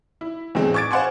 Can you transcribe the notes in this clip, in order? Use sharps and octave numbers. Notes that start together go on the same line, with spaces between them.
E4
E2 A2 G#3 C4
C#6 D6 G#6 A6 D7
C5 F5 F#5 G#5 C6 C#6